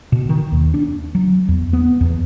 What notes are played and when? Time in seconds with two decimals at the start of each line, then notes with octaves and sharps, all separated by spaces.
0.12 B2
0.29 D#3
0.52 D#2
0.74 D4
1.15 F#3
1.48 E2
1.73 B3
2.01 E2